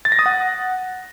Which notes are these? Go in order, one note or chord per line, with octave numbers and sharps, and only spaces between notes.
A6
A#6
D#6
F#5